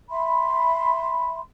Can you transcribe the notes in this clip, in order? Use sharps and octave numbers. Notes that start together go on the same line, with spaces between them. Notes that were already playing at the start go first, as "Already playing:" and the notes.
E5 B5 C6